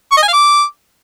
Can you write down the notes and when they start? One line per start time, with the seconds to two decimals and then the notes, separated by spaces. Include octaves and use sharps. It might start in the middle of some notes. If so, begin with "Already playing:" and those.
0.12 C#6
0.17 D#5
0.23 G#5
0.28 F5
0.33 D6